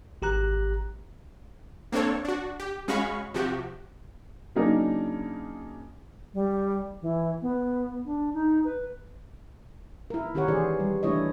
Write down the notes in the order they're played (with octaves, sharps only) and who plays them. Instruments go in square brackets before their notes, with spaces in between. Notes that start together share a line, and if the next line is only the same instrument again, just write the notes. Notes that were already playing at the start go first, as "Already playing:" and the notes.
[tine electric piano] G#1 G4 A#5 F#6
[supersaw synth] A#3 C4 D4 A4 C#5
D4 F#4
G4
G#3 C#4 F#4 F5 B5 C#6
C3 F3 F#4 G4
[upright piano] C#3 F#3 A#3 D4 D#4 A#4
[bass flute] G3
E3
B3
D4
D#4
B4
[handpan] E4 A#4
D#3 C#4 G4 A#4 C#5 F#5
E3 G4 G#4 C5 D5
G3
E3 A3 D4 E4 C#5 D#5